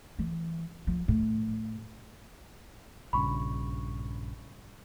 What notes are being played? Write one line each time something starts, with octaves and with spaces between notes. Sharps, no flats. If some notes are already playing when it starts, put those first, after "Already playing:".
E3
F3
A2
A#1 G2 C#3 B5 C#6